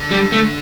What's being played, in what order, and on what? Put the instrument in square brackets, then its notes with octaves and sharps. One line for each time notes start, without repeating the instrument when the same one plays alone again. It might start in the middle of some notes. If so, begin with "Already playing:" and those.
Already playing: [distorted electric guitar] D3
[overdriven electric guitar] G3
A3